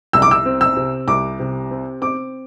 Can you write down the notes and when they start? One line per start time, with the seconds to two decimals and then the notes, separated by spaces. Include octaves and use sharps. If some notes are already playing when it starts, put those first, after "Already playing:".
0.13 C2 E6
0.22 D6
0.31 E6
0.46 C4
0.61 E6
0.76 C3
1.08 C2 D6
1.40 C3
1.71 C4
2.01 C4 D6